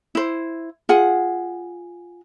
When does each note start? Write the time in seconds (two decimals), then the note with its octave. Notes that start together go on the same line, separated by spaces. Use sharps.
0.15 E4 C5
0.89 F4 G#4 F#5